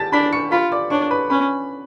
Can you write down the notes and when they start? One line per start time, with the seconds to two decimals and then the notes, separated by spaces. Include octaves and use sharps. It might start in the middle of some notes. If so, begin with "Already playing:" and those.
Already playing: A5 A6 B6
0.12 D4 B5 B6
0.32 C#6 C#7
0.51 F4 B5 B6
0.72 D5 D6
0.90 D4 C#5 C#6
1.11 B4 B5
1.30 C#4 B4 B5